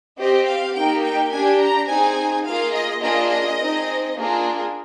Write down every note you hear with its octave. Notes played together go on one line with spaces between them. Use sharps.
C4 G4 D#5
F5
A#3 D#4 G4 G5
G5
D4 G4 G#5
A#5
C4 D#4 G#4 G#5
A#3 F4 G#4 F5
D#5
A#3 D4 F4 G#4 D#5
D#5
C4 D#4 G#4
A#3 D4 F4 G#4